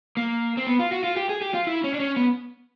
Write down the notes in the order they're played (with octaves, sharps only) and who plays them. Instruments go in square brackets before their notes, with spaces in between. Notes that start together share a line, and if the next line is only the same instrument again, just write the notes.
[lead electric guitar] A#3
C4
B3
F4
F#4
F4
G4
G#4
G4
F4
E4
C#4
D4
C#4
B3